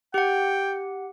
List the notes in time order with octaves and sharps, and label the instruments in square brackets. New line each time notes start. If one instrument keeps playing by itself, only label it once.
[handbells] G4 F#5 [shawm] G5